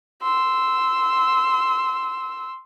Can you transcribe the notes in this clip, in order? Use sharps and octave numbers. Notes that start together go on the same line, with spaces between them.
C6 E6